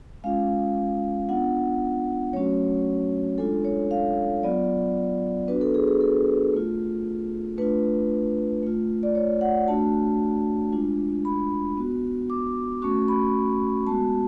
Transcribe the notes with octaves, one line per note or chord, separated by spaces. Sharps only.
G#3 C#4 F4 F5
B3 D4 F4 F#5
F#3 A3 C#4 F#4 C#5
G#3 D4 F4 A4
C#5
F5
F#3 B3 F4 D5
B3 D4 F#4 B4
A4
G#4
G#4
A4
A3 F4
A3 D4 F4 B4
A3 F4
D5
C#5
F#5
A3 D4 F#4 A5
G#3 D4 F4
B5
B3 F#4
D6
A3 C#4 F#4 C#6
B5
G#3 B3 F#4 A5